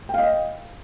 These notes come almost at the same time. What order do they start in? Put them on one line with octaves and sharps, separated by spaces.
G5 F5 D#5